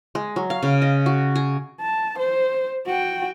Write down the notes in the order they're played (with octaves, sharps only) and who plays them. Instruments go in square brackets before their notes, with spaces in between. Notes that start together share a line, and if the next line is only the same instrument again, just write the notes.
[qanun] G#3
F#3
F5
C#3
D#5
F#4
G#4
[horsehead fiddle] A5
C5
F#4 G5